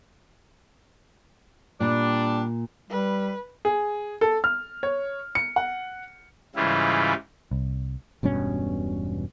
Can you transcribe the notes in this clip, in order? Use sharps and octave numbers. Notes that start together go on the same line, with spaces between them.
A#2 G3 D4
G3 B4
G#4
A4
F6
C#5
C#7
F#5
G#2 C#3 E3 G3 E4 F4
C2
E1 G2 B2 C#4